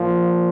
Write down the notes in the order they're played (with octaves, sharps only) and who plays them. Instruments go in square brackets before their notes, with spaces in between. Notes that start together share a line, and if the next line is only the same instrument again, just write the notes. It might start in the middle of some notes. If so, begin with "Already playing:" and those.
Already playing: [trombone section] A#2 F3